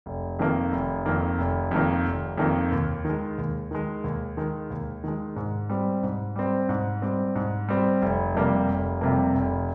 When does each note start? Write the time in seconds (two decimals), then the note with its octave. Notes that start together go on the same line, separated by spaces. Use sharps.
0.06 F1
0.39 F2 D#3 A#3
0.72 F1
1.06 F2 D#3 A#3
1.38 F1
1.71 F2 D#3 A#3
2.05 F1
2.38 F2 D#3 A#3
2.72 D#2
3.05 D#3 G#3
3.38 D#2
3.71 D#3 G#3
4.04 D#2
4.37 D#3 G#3
4.70 D#2
5.04 D#3 G#3
5.36 G#2
5.70 G3 C4
6.03 G#2
6.36 G3 C4
6.69 G#2
7.02 G3 C4
7.35 G#2
7.68 G3 C4
8.02 F1
8.35 F2 C3 G3 A#3
8.69 F1
9.01 F2 C3 G3 A#3
9.34 F1